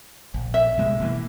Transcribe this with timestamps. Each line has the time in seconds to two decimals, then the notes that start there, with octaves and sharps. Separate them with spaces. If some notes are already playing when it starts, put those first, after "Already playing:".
0.34 A#1
0.54 E5
0.78 B2 G#3 A#3
1.00 B2 E3 A#3